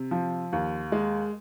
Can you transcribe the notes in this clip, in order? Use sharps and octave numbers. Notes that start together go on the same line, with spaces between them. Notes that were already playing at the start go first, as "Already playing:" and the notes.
Already playing: C3
F3
D#2
G#3